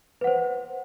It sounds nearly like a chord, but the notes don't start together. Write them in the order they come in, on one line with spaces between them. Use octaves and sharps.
B4 F#5 C5